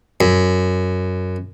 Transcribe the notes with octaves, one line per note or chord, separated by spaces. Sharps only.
F#2